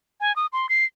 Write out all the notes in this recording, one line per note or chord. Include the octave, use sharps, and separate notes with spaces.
G#5
D#6
C6
C7